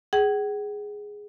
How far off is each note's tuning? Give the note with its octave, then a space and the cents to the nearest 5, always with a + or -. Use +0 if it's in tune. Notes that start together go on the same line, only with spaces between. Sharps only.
G#4 +0 F#5 +45